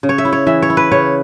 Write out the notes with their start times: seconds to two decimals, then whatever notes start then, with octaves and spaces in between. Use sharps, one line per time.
0.03 C#3
0.09 C#5
0.18 E5
0.25 E4
0.33 C#5
0.47 E3 E5
0.62 C#5
0.70 E4
0.77 B4
0.92 C#3 C#5